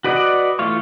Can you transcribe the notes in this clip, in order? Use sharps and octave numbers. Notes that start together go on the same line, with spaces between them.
F#4 B4 D5 D#5 F#5
E3 A3 F4 F5 C#6